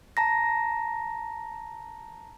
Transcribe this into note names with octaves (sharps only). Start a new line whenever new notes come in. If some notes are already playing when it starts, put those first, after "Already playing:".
A5 A#5 A#6